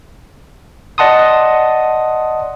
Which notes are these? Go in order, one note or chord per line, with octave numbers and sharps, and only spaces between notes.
D5 D#5 F#5 A5 C6 D#6